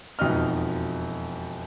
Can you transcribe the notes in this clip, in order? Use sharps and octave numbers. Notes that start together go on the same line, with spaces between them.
E1 F2 B2 D#4 D#5 F6